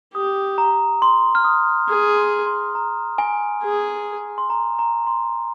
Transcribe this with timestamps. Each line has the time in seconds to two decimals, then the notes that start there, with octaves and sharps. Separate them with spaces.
0.14 G4 D#6
0.58 A#5
1.02 C6
1.35 F6
1.44 D#6
1.89 G#4 D#6
2.17 C6
2.46 C6
2.75 A#5
3.18 G#5
3.62 G#4
4.38 C6
4.50 A#5
4.79 A#5
5.07 C6